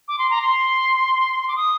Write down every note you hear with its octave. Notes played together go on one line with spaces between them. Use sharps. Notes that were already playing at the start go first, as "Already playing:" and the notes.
D6
C6
A#5
C6
C6
D6
D#6